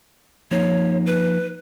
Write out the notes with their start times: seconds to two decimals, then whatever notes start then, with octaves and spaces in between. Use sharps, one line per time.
0.51 F3 A#3 D#4 C#5
1.06 B4